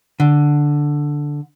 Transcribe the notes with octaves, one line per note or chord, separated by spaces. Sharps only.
D3